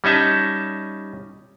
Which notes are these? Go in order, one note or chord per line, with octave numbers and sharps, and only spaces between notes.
G3 C#4 D#4 E5 A5